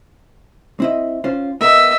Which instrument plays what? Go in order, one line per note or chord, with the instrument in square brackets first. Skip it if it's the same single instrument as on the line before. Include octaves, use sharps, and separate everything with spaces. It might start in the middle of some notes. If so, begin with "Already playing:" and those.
[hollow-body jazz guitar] C4 E4 D#5
C#4 F4 C5
[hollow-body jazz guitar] B3 A#4 [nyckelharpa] D#5 E5